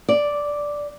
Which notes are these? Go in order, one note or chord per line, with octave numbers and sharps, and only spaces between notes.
D5